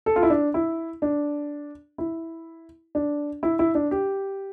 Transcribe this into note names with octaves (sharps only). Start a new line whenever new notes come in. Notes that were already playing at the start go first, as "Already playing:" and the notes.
A4
F4
E4
D4
E4
D4
E4
D4
E4
E4
D4
G4